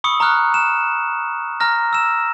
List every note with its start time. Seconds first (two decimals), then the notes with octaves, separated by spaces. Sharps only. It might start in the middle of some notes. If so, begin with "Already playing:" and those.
0.04 B5 C#6 D#6 E6 C#7
0.20 A#5 C#6 D#6 F6 F#6
0.54 E7
1.60 A#5 F6 A#6
1.93 E6 E7